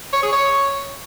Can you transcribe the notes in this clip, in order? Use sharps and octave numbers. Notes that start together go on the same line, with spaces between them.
C#5
G#4
C#5